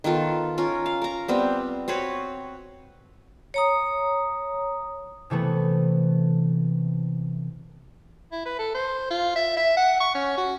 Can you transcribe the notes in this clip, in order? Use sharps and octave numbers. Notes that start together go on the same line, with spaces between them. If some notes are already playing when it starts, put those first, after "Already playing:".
D#3 B3 F4 A4
C#4 F4 A#4
F5
A#4 A#5
G3 B3 C4
C4 F#4 B4 C#5
C#5 A#5 D#6
C3 E3 A3 B3
E4
B4
A4
C5
F4
E5
E5
F#5
C#6
C#4
F#4